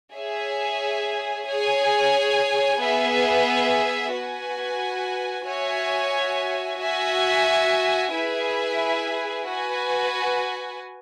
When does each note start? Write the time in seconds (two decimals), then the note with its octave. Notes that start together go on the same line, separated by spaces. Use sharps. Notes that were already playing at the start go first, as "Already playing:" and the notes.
0.14 G#4 C#5 E5 G#5
1.47 G#4 C#5 G#5
2.80 B3 G#4 E5
4.12 F#4 B4 G#5
5.46 F#4 C#5 E5 G#5
6.79 F#4 E5 G#5
8.12 E4 G#4 B4 E5 G#5
9.45 F#4 B4 G#5